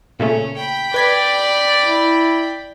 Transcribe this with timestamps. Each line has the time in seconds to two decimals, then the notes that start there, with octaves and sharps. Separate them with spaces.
0.20 A#2 C#3 A3 C#4
0.57 G5 B5
0.94 B4 D5 G#6 B6
1.84 E4